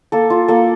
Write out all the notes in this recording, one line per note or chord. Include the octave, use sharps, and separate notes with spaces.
A#3 A4
F4
A#3 A4